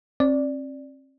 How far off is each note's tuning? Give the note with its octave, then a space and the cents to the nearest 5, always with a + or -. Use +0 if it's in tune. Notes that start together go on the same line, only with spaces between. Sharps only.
C4 +45 D5 +0